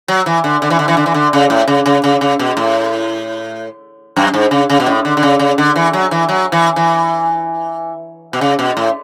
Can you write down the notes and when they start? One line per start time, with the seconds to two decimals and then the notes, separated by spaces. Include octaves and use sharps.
0.08 F#3
0.26 E3
0.44 D3
0.62 D3
0.70 E3
0.79 D3
0.88 E3
0.97 D3
1.06 E3
1.14 D3
1.33 C#3
1.50 A2
1.68 C#3
1.86 C#3
2.04 C#3
2.21 C#3
2.39 B2
2.57 A2
4.16 F#2
4.34 G#2
4.51 C#3
4.70 C#3
4.80 B2
4.87 A2
5.05 D3
5.17 D3
5.23 C#3
5.39 C#3
5.58 D3
5.76 E3
5.93 F#3
6.11 E3
6.29 F#3
6.52 E3
6.76 E3
8.33 B2
8.41 C#3
8.59 B2
8.77 A2